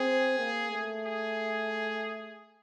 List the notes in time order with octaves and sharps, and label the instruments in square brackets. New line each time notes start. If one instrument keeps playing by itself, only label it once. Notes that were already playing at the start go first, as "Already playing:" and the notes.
Already playing: [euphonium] C4 [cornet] G#4
[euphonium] A#3
A3
[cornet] G#4